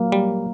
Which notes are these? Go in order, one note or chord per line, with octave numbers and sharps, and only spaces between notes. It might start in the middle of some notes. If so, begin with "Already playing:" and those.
Already playing: F#3 A#3
G3